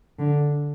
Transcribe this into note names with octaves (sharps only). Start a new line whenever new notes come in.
D3